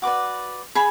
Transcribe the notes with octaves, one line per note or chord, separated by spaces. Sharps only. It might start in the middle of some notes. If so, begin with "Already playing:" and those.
F#4 B4 D5 D6
G#4 B5